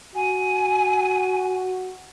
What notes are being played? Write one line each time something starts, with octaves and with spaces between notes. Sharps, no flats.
F#4 G#5